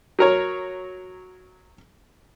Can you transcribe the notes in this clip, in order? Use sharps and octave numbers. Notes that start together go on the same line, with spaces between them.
F#3 A#4 C#5